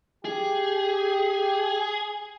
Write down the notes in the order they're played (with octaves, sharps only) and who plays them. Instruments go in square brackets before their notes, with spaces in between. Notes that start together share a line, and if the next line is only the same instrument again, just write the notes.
[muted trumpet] G4 [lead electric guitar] G#4